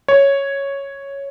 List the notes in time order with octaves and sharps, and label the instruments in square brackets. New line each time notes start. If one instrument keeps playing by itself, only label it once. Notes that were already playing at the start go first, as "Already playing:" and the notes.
[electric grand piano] C#5